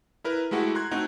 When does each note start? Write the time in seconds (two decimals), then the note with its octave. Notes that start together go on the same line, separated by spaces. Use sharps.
0.24 E4 A#4 B4
0.51 G#3 A3 E4 F#4 G4
0.75 A#5 C6 F#6 G#6
0.91 A3 C4 D#4 F#4